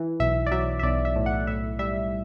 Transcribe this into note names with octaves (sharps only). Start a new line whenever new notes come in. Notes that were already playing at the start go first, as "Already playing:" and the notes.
Already playing: E3
B1 E5
D5
F#3 E5
E5
B1 D5
E5
A2
F#5
A2 E5
G3 E5